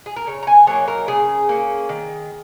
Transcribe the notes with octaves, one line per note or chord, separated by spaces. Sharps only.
G#4
A#4
C#3 C#5
A#5
G#5
F#3 A#3 D#4 C#5
A#4
C#3 G#4
A#3 C#4
D#3